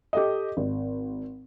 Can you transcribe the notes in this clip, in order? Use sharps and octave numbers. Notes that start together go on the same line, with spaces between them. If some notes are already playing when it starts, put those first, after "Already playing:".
G4 A4 D#5
G#1